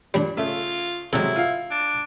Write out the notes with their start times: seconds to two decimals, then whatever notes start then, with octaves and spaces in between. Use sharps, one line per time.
0.14 A#2 G3 D4
0.37 C#3 A3 F4 E5
1.13 C3 F#3 G#3 E4 A4 E5
1.36 F4 F5
1.71 D4